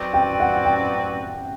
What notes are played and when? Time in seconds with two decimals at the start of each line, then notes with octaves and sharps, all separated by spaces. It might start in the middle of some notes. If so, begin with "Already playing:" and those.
Already playing: F#3 C4 F#4 B4 D5
0.14 G5
0.40 F#5
0.65 G5